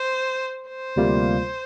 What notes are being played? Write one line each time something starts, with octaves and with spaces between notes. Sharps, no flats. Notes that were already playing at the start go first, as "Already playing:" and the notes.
Already playing: C5
C5
D2 C3 G3 A#3 F4